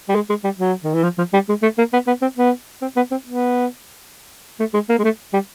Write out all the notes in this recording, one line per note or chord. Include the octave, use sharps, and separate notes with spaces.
G3
G#3
G#3
G3
F#3
D#3
E3
F3
F3
G3
G#3
A3
A#3
B3
B3
C4
B3
C4
B3
C4
B3
A3
G#3
A#3
G#3
A3
G3